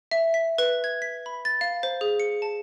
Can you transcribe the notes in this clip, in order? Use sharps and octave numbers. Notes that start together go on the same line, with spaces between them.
E5
B6
B4
G#6
B6
B5
A6
F5
C5
G#4
C#7
A5